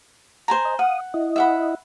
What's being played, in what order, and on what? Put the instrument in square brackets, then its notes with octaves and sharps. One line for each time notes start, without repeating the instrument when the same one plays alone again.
[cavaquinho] C5 G#5 A#5
[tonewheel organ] D#5
[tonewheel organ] F5 D#6 [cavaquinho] F#5
[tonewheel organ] E4 D#5
[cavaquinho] E5 F#5 B5